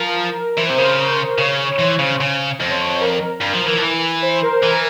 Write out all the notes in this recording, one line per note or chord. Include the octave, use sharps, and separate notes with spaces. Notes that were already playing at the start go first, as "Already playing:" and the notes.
Already playing: F3 A#4
E3 C5
C3 C5
C#3 A#4
A#4
C5
C5
C#3 C#5
E3 C5
C#3
C#3
F2 C5
C#5
C#5
C#5
A#4
G2
F3
E3
F3
E3
C5
C5
A#4
C5
E3 A#4